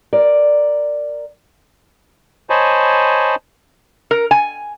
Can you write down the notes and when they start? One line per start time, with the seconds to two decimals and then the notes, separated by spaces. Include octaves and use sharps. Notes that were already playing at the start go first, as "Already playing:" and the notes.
0.13 A#4 D5
2.50 C5 C#5 D#5 G#5 A5 B5
4.11 A#4
4.31 G#5